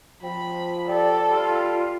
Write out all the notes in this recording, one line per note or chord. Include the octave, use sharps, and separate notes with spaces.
F3 C4 B5
G4 A4 D5
G3 F4